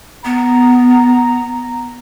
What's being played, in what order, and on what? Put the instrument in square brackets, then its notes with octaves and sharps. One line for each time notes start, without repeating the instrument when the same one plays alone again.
[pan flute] B3 [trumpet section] A#5